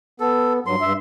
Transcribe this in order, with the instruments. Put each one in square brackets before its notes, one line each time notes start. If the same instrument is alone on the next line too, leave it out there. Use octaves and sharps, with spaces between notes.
[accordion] B3 [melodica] A4
[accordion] G2 F#3 [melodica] C6
[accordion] G2 E5